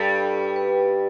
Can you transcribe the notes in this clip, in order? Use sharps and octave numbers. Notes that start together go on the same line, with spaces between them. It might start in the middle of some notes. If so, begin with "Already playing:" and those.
Already playing: G2 G3 A4
B4